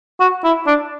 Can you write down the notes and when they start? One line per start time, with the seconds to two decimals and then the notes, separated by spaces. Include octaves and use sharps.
0.20 F#4
0.44 E4
0.67 D4